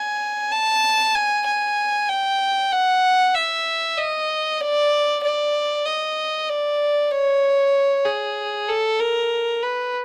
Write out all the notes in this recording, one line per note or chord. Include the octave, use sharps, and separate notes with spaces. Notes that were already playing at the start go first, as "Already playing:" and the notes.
Already playing: G#5
A5
G#5
G#5
G5
F#5
E5
D#5
D5
D5
D#5
D5
C#5
G#4
A4
A#4
B4